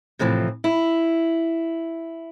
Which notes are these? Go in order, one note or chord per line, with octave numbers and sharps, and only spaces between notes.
A2 C3 E3 F3
E4